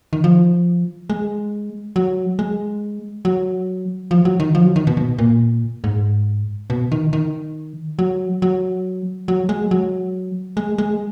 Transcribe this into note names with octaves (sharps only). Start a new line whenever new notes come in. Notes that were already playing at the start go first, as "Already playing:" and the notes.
D#3
F3
G#3
F#3
G#3
F#3
F3
F#3
D#3
F3
F#3
D#3
B2
B2
A#2
G#2
B2
D#3
D#3
F#3
F#3
F#3
G#3
F#3
G#3
G#3